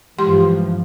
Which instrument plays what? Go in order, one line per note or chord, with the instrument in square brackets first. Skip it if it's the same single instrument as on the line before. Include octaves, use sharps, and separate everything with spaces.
[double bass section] G2 E3 F3 [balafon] G#3 G4 C6